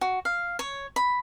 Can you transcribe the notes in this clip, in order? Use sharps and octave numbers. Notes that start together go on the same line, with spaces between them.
F#4
F5
C#5
B5